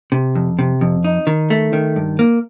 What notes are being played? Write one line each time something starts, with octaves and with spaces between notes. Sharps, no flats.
C3
F2
C3
F2
D#4
D#3
A3
D#3
G2
A#3